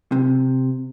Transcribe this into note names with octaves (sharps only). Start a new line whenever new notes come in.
C3